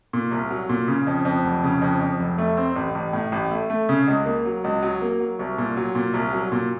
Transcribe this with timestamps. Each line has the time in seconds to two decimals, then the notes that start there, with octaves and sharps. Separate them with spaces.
0.13 A#2
0.31 C2
0.50 F#3
0.69 A#2
0.88 C#3
1.07 F2
1.25 F2
1.45 F1
1.64 C#3
1.82 F2
2.01 F2
2.20 F1
2.38 A3
2.57 C4
2.76 A1
2.95 A1
3.13 A2
3.32 A1
3.51 A3
3.70 A3
3.89 C#3
4.08 C#2
4.26 A#3
4.45 F#3
4.64 C#2
4.83 F#3
5.02 A#3
5.20 F#3
5.39 C2
5.58 A#2
5.77 F#3
5.95 A#2
6.14 C2
6.33 F#3
6.52 A#2